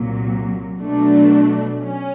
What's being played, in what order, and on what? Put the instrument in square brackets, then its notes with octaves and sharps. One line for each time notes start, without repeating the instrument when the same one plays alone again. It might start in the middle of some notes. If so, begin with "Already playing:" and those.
Already playing: [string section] C2 A#2 F#3
B2 F#3 A3 D4
C#4